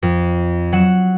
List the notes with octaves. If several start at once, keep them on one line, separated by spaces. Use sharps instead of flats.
F2
F#3 F#5 E7